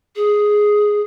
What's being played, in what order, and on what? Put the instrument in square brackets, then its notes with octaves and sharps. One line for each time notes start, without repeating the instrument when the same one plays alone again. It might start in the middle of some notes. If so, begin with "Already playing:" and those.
[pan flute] G#4